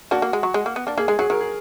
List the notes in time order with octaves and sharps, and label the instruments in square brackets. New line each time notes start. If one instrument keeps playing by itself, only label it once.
[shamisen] A#3 D4 [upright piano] F#4
[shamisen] A#3
G#3
F#3
G#3
A#3
B3
A#3 D4
[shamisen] A#3 [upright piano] G#4
[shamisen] G#3 [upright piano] G#4
[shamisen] F#3 [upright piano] G#4
[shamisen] F#3 [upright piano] A#4
[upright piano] G#4